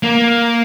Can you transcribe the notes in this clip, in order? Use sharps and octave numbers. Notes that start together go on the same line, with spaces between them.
A#3